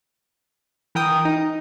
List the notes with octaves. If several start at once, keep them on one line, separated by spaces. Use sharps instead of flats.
E3 A#4 G5 D#6
D#4